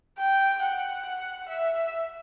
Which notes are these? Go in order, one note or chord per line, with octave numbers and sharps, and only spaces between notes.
G5
F#5
F#5
E5